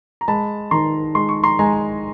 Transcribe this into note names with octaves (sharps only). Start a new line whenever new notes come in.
A#5
G#3 A5 B5
D#3 A#5 C6
G#3 C6
C#6
A#5 C6
G#3 G#5 A#5